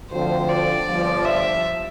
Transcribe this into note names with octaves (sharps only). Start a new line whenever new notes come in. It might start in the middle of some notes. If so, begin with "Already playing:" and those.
D2 D3 F3 C4 C5
D5
G1 G2 F3
E5